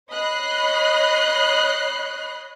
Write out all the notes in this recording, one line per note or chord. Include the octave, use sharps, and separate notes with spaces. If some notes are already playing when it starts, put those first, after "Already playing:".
C#5 D#5 B5 F#6 C7